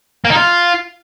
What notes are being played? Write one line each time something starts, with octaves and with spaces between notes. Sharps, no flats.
A#3
D#4
F4